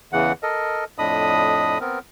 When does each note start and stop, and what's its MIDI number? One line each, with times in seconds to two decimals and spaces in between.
0.13 0.32 40
0.13 0.32 49
0.13 0.32 52
0.13 0.32 78
0.43 0.84 69
0.43 0.84 70
0.43 0.84 75
0.98 1.78 41
0.98 1.78 45
0.98 1.78 62
0.98 1.78 75
0.98 1.78 83
0.98 1.78 87
1.81 1.99 59
1.81 1.99 60
1.81 1.99 70